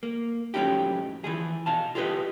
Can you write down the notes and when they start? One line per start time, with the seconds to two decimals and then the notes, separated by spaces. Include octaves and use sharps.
0.03 A#3
0.54 F#2 A2 F3 C#4 D#4 G4
1.24 E3 F3 G#4
1.66 B2 F5 A5
1.95 F4 G4 G#4 B4 D#5